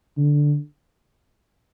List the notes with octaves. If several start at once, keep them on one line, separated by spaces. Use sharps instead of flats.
D3